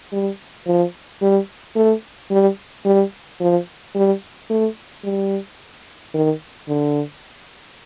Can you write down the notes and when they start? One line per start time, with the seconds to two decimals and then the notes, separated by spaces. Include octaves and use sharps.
0.13 G3
0.67 F3
1.21 G3
1.76 A3
2.31 G3
2.85 G3
3.40 F3
3.95 G3
4.50 A3
5.04 G3
6.14 D#3
6.69 D3